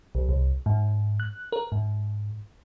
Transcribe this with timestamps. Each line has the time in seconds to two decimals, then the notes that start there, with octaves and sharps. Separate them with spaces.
0.15 B1
0.29 C2
0.66 G#2
1.20 F#6
1.52 A#4
1.72 G#2